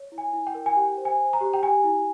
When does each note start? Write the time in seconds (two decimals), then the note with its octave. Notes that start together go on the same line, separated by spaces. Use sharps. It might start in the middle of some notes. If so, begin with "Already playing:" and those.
Already playing: C#5
0.12 E4
0.18 G#5
0.33 E4
0.47 G5
0.55 A#4
0.66 G#5
0.76 G4 G5
0.97 C5
1.05 G#5
1.19 C5
1.33 A#5
1.41 G4
1.53 G5
1.63 G4 G#5
1.84 E4